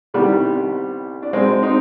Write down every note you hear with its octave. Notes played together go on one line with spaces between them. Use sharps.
C2 C3 D#3 G3 B3
D4
B1 B2 G#3 C4
C4 D#4